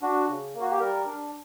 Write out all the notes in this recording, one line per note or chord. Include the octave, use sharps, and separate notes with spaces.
D4 F#4
C#3
A#3
F#4
G4
G3 A#4
D4